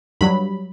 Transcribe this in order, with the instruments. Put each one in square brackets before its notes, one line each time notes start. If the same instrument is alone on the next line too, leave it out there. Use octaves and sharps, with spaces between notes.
[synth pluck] G2 F#3 B5